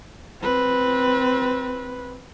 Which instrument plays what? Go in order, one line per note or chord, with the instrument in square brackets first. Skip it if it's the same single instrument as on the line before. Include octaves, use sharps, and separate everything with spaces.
[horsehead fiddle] C4 B4